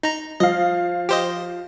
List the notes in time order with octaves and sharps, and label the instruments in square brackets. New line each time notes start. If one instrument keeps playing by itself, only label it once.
[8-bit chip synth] D#4 A#5
[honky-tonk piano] F3 F5 [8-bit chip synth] D#5
[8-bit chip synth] G4 C5 D#5